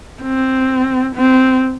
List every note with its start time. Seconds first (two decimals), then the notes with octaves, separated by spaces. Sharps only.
0.22 C4
1.14 C4